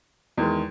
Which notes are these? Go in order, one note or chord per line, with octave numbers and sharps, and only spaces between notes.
E2 D#3 G#3